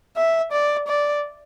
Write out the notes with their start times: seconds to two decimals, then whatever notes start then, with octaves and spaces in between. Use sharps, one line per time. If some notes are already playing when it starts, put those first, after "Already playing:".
0.16 E5
0.52 D5
0.88 D5